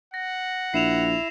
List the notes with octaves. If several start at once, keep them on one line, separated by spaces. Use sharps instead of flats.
F#5 A#6
A#1 E4 C7 E7 F7